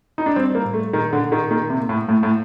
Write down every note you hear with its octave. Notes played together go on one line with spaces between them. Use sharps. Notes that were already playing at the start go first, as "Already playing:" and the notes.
D#4
D4
G3 C4
A#3
A2
A3
A#2 D#3
D3
A#2
D#3
D#3 A#3
C3
A#3
A2
A2 A3
A2